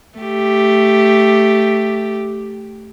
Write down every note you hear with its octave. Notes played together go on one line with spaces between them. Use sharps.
A3 G4